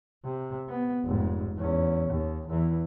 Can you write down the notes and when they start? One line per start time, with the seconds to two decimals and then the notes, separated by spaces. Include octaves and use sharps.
0.24 C3
0.69 B3
1.05 F1 G#2
1.58 E2 C#4
2.11 D#2
2.49 E2 E3